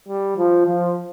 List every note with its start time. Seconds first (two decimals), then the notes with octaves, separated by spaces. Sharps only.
0.08 G3
0.38 F3
0.67 F3